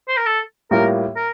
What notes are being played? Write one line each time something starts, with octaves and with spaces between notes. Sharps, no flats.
C5
A#4
A4
A2 G3 A#3 F4 A#4
A#4